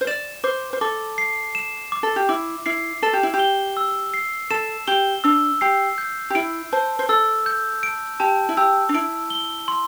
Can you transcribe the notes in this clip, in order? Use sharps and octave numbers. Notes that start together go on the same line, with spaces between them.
C5
D5 E7
C5 D6
C5
A4 D6
C7
E7
D6
A4
G4
E4 D6
E4 C7
A4 E7
G4
E4
G4
G7
E6
C7
A4 E7
G4 G7
D4 E6
G4 C7
G6
G4
E4 D7
C5 A5
C5
A4 E6
G6
D7
G4 A5
E4
G4 E6
D4
E4 D7
G7
C6